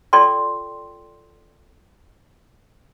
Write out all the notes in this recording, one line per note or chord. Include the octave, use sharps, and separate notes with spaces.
F4 A4 D5 G5 C6